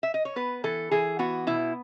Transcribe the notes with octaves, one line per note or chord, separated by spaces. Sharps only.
E5
D#5
C#5
B3 B4
E3 A4
E3 G#4
B3 F#4
B2 E4